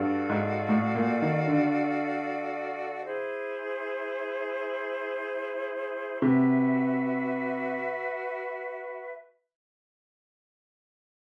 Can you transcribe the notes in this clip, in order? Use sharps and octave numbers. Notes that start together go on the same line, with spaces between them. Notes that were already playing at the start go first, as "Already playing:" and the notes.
Already playing: G2 F#4 A4 D5 F5
G#2
A2
A#2
D#3
D3
E4 G#4 C5
C3 F#4 B4 E5